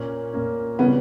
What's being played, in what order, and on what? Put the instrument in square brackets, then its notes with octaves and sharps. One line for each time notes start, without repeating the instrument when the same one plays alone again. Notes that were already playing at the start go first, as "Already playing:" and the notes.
Already playing: [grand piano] A#2 A#3 C#4
A#2 A#3 C#4
[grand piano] C#3 E3 G3 C#4 [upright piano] B3